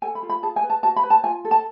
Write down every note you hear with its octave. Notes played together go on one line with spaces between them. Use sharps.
A4 G#5
B5
F4
B5
G#4 A5
G#5
B4
A5
F#4 A5
B5
B4
A5
F4 G#5
A4
A5